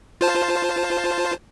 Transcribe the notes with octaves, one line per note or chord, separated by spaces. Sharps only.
F4 C5 A5